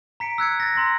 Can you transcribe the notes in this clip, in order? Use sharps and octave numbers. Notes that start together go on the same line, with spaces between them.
A#5 B6 C#7 D7
E6 F#6 G#6 C#7
A6 A#6
A#5 C6 E6 A#6